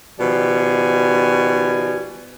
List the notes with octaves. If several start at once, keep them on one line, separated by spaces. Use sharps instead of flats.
B2 D#3 F3 G3 G#5